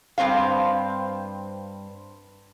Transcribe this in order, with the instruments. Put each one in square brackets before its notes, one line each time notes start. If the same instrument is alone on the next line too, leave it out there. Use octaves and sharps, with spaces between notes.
[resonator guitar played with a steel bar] G2 C4 C5 F5